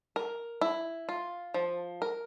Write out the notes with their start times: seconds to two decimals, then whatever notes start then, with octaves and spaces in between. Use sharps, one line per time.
0.16 A#4
0.61 E4
1.09 F4
1.54 F3
2.02 A#4